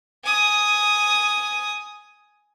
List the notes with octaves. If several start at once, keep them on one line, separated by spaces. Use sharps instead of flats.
G#5 D#6